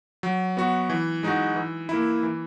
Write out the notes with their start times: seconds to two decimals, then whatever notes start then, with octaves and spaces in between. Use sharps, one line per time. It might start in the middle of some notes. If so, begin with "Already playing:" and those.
0.23 F#3
0.57 B3 F#4
0.90 E3
1.23 G#3 D#4 F#4
1.56 E3
1.89 A#3 E4
2.23 E3